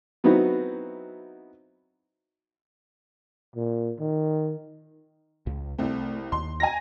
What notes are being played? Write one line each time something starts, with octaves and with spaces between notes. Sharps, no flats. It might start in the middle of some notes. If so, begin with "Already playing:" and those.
F#3 B3 C4 D#4 E4 F#4
A#2
D#3
C#2
C2 A3 C4
D#2 C6
G#5 A#5 A#6